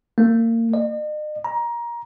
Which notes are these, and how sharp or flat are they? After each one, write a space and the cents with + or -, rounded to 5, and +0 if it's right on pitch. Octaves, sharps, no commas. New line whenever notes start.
A#3 -30
D#5 -45
A#5 +20